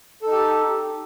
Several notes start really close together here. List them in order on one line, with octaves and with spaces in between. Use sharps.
A4 D#4 G4